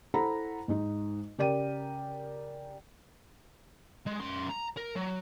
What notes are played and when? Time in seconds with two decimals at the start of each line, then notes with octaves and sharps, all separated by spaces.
0.14 E4 A4 C5 F#5 A#5 B5
0.68 G#2 G#3 D#4
1.38 C#3 G4 A#4 D5 G5 D#7
4.06 G#3
4.20 F#2 C6
4.49 A#5
4.76 A#4
4.96 F#3